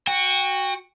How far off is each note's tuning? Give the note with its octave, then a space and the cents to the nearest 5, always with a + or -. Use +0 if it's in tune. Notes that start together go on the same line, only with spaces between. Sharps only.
F#4 +0 G5 +30